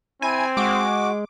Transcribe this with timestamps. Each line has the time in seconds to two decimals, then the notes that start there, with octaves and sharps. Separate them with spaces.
0.22 C4 E4 G#5
0.57 G#3 F#4 D6